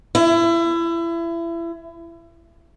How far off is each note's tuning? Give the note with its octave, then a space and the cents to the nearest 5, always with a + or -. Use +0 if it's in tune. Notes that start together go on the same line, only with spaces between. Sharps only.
E4 +30